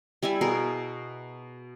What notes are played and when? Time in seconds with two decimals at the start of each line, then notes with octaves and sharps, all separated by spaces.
0.22 G3 E4 E5 G#5
0.41 B2 G#4 A#4